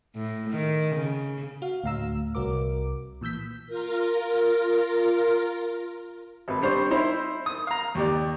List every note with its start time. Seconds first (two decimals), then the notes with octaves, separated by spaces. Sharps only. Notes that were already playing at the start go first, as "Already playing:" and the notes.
0.15 A2
0.50 D#3
0.96 C#3
1.62 F#4 F5
1.84 D2 A2 F5 A#5 E6
2.35 C2 F#4 A#4 D6
3.21 A#2 E3 E6 G6 B6
3.67 F4 A#4
6.48 G#1 B4
6.62 G3 D4 C5 C6 C#6
6.91 D#4 E4 C5
7.46 D#6
7.67 F5 A#5
7.95 D#2 G4 D5